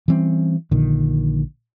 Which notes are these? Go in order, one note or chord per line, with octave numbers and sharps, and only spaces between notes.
E3 G3 C4 C#4
A#1 A#2 D3 D#3